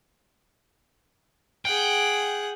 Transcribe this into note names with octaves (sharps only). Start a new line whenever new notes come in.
G#4 F#5 G5